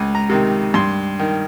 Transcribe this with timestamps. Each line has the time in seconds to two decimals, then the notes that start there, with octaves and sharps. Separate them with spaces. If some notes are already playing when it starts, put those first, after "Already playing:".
Already playing: C#2 G#5
0.15 A#5
0.29 C3 D#3
0.74 G2 C6
1.20 D#3